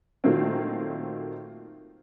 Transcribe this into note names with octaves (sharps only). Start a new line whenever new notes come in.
A#2 D#3 F#3 A3 A#3 C4